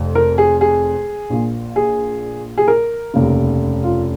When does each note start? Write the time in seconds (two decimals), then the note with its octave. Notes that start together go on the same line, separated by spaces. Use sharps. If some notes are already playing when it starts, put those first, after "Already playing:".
Already playing: F1 F2
0.15 A#4
0.38 G#4
0.61 G#4
1.30 A#1 A#2
1.76 G#4
2.58 G#4
2.68 A#4
3.14 F1 D#2 C#3
3.84 F4